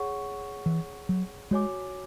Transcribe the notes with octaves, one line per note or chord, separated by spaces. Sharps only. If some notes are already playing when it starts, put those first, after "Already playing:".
Already playing: G#4 C#5 F#5 C#6
E3
F#3
G#3 F#4 C#5 G#5 D6